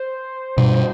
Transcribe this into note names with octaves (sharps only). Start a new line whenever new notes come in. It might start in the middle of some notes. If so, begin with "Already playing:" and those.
Already playing: C5
G2 B2